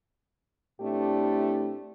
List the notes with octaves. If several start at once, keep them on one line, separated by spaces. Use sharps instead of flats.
A2 A3 C4 D4 E4 G4